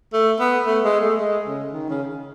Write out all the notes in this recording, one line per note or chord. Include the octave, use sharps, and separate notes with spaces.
A3
B3
A3
G#3
A3
G#3
C#3
D#3
C#3